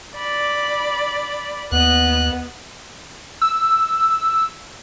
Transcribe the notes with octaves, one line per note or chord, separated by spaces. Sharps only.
D5 B5
D#2 B3 D#5 F#6
E6